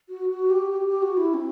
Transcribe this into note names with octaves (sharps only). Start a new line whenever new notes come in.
F#4
F#4
G4
G4
G4
F#4
E4
C4